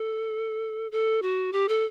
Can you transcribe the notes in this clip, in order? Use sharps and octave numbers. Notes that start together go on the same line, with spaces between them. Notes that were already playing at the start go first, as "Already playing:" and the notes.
Already playing: A4
A4
F#4
G4
A4